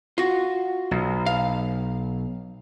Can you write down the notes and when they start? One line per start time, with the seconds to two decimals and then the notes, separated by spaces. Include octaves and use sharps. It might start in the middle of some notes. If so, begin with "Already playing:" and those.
0.18 F4 F#4
0.91 B1
1.26 F5